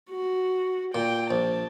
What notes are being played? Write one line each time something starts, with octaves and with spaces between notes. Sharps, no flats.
F#4
A#2 G5
A#1 A5